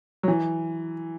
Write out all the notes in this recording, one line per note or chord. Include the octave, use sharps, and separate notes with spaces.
F#3
E3